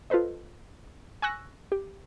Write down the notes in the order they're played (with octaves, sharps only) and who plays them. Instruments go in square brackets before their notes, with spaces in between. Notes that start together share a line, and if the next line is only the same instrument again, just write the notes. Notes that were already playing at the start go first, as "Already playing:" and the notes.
[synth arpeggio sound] F4 A4 B4 C5 D#5
G#5 C#6 E6 F#6 A#6
G4